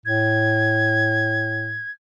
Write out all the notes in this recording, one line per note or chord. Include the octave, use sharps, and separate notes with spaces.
A2 G#6